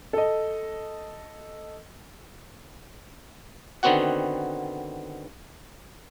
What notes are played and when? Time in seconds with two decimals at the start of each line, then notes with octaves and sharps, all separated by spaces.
0.13 A4 D#5
3.83 D3 D#3 B3 C4 F#4 F#5